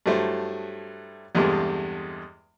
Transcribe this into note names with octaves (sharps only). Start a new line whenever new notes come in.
G2 F#3 A3 E4 C5
E2 G2 C3 G#3 A3